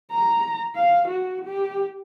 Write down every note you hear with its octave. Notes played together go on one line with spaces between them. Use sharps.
A#5
F5
F#4
G4